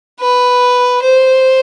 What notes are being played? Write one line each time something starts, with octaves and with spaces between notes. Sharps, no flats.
B4
C5